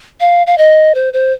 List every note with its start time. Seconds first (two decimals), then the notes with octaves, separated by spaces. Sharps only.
0.20 F5
0.47 F5
0.58 D#5
0.95 C5
1.13 C5